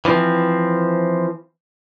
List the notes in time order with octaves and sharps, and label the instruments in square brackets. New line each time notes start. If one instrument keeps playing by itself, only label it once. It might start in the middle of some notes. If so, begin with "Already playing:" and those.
[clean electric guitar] E3 F3 C4